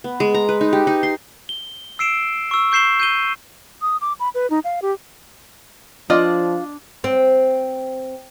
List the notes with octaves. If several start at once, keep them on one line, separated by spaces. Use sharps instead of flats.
B3
G#3
A#5
B4
D#4
G4
D#4
C6
G7
E6 C7 D7 E7
C#6 E6
C#6 G6 C7 E7 G7
G6 D#7 G7
D#6
D6
B5
B4
D#4
F5
G4
F3 D4 F4 D5 D#5
C4